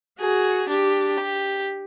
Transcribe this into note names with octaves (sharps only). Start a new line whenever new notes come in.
F#4 G#4
D4 G4
G4